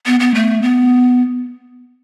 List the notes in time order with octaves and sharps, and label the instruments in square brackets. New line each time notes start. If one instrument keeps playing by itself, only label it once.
[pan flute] B3
B3
A3
B3